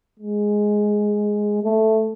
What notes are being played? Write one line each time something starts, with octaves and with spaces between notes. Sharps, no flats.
G#3
A3